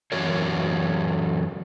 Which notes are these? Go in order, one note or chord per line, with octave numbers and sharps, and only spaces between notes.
F#2 E3 F#4 A#4 C#5